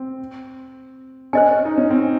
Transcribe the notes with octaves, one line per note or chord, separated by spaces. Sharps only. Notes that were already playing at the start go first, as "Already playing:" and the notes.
Already playing: C4
C#4 C5 D#5 G#5
D#4
C#4
C4